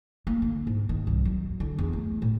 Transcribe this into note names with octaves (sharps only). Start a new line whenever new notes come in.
A#3
D3
G#2
D#3
C2
F#3
D3
E2
A3
A2